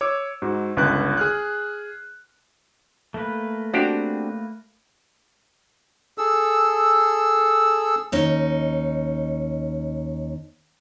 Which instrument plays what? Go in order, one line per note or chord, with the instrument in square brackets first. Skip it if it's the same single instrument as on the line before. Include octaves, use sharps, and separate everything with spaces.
[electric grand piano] C#5 D6 E6
G#2 F#4
G1 C#2 B4 F#6
G#4 F6 F#6
[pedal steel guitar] A3 A#3 B4
[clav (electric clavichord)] C4 D4 G4 [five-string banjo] F#4
[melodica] G#4 A4 E6
[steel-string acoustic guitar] D#2 C#4 D#4